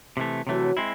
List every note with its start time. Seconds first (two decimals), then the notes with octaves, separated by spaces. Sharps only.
0.17 C3 E3 A3
0.47 C3 E3 F#3 A3
0.77 G#3 C4 E4